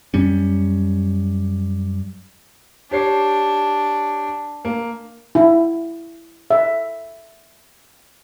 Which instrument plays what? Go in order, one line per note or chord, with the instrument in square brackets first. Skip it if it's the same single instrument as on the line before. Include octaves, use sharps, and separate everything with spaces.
[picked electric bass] F#2 G3 C#4
[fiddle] D4 [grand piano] G4 C#5 C7
[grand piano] A#3
[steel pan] E4
E5